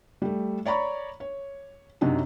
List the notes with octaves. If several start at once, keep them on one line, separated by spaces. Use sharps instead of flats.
G3 A3
C#5 D5 A#5 B5 C#6
C#5
F#2 C3 F#3 D4 D#4